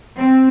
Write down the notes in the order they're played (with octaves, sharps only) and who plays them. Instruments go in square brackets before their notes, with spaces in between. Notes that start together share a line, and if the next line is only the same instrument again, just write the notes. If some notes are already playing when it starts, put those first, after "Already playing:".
[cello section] C4